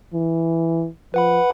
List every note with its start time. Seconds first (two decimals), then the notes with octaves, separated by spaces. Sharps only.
0.14 E3
1.14 F3 B4 F#5 B5